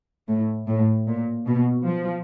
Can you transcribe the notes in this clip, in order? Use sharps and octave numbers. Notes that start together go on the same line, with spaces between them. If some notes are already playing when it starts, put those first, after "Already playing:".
A2
A2
A#2
B2
F3